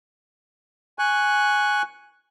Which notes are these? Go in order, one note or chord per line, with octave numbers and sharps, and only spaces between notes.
G#5 C#6 F#6